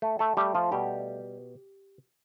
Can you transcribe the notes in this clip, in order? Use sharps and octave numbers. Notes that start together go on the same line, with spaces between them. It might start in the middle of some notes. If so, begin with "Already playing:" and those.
A3 A4
A3 A4
G3 A3 G4
F3 F4
B2 G3 G4